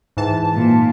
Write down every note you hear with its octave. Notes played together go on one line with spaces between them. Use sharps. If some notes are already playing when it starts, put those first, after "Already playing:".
G#2 E3 A5
A#2